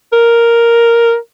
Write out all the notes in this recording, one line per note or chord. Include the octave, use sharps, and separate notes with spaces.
A#4